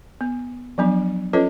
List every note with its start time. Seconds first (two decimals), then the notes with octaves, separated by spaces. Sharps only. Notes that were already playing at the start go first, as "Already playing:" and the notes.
0.21 B3
0.78 F3 F#3 B3 D4
1.33 C#4 F4 A4 B4 C#5 D#5